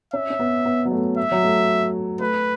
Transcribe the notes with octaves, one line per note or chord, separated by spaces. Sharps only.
C#4 E5
C#4
B3
B3
F#3
A3
E5
F#3
A3
A3 B4